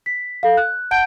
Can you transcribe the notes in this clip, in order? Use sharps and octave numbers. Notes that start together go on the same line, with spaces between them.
B6
A4 F5
F#6
F#5 A5 G6 D7